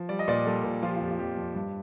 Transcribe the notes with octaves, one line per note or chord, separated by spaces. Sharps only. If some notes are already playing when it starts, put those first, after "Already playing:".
Already playing: F3
G3 D5
D#5
A#2 D5
G3 A4
A#2
F3 F4
G4
F4
F2 G4
F4
F2 G4
F2
G2